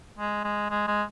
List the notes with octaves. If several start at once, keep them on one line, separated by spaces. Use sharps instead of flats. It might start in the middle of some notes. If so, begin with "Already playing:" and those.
G#3
G#3
G#3
G#3